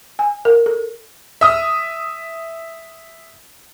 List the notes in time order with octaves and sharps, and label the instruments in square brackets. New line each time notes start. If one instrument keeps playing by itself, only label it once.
[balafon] G#5
A#4
A4
[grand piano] E5 D#6 F6